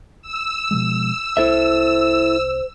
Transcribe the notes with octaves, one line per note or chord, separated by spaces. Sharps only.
E6
B2 F3 G#3
C2 E4 A4 C5 E5